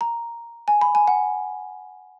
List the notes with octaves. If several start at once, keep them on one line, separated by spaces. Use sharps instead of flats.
A#5
G#5
B5
G#5
F#5